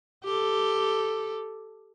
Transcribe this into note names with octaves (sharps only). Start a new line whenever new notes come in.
G4 A4